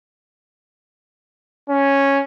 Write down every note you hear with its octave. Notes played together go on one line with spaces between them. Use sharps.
C#4